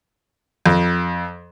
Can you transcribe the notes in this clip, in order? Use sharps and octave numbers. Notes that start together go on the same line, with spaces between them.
F2